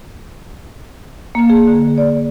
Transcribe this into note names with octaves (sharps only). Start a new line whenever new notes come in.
A#3
G#4
D3
D5